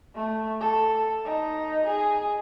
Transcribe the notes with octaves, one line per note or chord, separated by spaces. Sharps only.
A3
A4
D#4
G#4